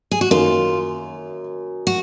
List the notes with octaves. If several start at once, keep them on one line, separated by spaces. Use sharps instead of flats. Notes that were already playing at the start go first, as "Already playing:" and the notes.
G#4
F#4
F#2 D#3 A#3 F4
F#4